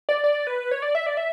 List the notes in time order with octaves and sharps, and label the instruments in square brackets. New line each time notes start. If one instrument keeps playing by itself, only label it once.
[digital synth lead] D5
D5
B4
C#5
D5
E5
D5
E5